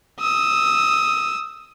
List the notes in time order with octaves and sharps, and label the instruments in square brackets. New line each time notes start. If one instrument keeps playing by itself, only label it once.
[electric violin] D#6 E6